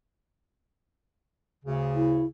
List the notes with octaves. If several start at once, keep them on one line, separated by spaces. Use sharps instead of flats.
D2 C#3
E4